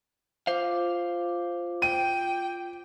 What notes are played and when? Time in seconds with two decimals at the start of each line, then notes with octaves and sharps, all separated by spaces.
0.47 F4 C5 F5 D6
1.82 G5 D#7